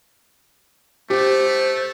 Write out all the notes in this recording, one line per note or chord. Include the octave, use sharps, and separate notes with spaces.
A3 G4 C5